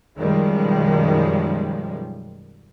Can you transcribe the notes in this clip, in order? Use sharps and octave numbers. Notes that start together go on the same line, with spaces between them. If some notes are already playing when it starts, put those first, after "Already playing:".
F#2 B2 D#3 F3 G3 G#3